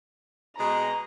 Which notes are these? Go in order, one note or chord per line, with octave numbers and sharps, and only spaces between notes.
B2 G#3 A#5